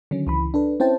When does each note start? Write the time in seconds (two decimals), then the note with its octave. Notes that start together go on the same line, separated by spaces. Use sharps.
0.11 D3 D#3 F#3 C#4
0.27 C#2 E3 B5
0.54 D4 A4 B4
0.80 C4 C#4 E4 C5 G5 A5